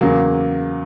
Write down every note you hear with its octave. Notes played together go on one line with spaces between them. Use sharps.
E2 C#3 F#3 A#3